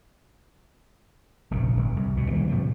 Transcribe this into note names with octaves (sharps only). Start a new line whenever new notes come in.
F1 A#1 G2 C#3
G1
C2
D2 B2
D#3 G3 A3 A#3
A2 C3 F3 F#3